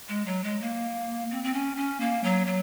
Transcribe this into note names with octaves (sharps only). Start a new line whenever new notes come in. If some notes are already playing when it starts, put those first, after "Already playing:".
G#3
F#3
G#3
A#3
C4
C4
C#4
C#4
A#3
F#3
F#3